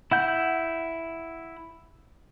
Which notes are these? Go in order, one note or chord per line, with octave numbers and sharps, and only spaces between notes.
E4 F#5 G6